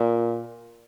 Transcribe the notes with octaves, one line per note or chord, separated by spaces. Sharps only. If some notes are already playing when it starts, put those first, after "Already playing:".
Already playing: A#2